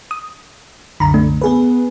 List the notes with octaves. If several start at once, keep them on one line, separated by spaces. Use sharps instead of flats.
D#6
C2 F#2 D3 A#5 B5
A3 D4
B3 G#4 B4